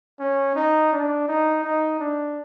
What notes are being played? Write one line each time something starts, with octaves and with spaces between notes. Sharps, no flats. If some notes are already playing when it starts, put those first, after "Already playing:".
C#4
D#4
D4
D#4
D#4
D4